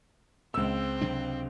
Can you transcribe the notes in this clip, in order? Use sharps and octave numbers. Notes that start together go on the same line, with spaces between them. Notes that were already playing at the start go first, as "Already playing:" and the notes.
C#2 C4 E6
C3 F#3 D4